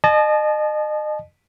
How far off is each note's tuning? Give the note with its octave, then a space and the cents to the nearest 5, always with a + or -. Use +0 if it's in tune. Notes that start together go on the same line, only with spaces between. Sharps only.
D#5 -35 A5 -35